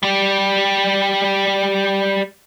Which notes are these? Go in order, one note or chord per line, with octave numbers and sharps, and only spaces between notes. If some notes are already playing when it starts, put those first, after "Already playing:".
G3 G4